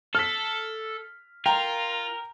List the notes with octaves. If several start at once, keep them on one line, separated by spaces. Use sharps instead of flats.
A4 F6 B6
F4 A#4 G5 A#5